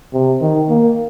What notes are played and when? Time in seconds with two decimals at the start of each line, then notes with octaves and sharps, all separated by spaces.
0.14 C3
0.41 D#3
0.69 A#3